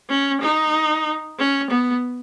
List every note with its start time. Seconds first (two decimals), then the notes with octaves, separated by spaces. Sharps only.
0.09 C#4
0.41 D#4
1.39 C#4
1.70 B3